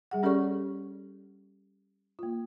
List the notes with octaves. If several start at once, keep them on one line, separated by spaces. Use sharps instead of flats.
G3 G#4 F#5
C#4 G4 A4 C#5 D5 C#6
A#3 F4